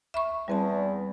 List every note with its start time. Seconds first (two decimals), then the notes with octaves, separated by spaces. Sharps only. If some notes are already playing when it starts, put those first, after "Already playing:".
0.14 E5 B5 C#6
0.48 E2 G3 C4 A5